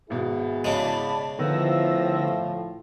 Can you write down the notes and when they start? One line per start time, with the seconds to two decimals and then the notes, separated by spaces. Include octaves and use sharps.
0.10 G#1 B2 E4 F#4 G#4
0.64 C#3 G#3 D5 A5 B5
1.39 A2 D3 D#3 F3 B3 E6 A#6